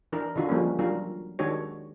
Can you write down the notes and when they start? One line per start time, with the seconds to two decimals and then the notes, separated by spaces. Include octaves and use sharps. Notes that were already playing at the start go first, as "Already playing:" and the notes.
0.12 E3 D4 A#4
0.36 D3 E3 D4 F4 F#4
0.49 F3 G3 G#3 A#3 C#4
0.79 E3 F#3 G3 D4 F4 A#4
1.39 D#3 G#3 D4 F#4 G4 C#5